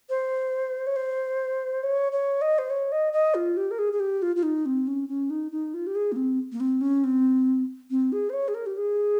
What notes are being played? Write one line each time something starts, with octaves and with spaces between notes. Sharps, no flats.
C5
C#5
C5
C#5
C#5
D#5
C5
C#5
D#5
D#5
F4
G4
A#4
G#4
G#4
G4
F4
F4
D#4
C4
C#4
C#4
D#4
D#4
F4
G4
G#4
A#3
C4
A#3
C4
C#4
C4
C4
G#4
C5
C#5
G#4
A#4
G4
G#4